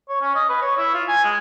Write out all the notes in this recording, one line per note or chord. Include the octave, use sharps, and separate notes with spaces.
C#5
C#4
D#5
B4
C#5
E4
F4
G#5
G#3